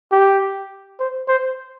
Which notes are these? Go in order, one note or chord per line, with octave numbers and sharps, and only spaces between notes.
G4
C5
C5